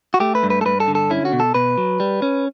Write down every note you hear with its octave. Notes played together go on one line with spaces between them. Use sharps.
F#4
A3 G4
B4
G2
B4
A4
G2 B4
A4
D3
A4
C#4 E4
F#4
B2
A4
B2 B4
F#3
G3
C#4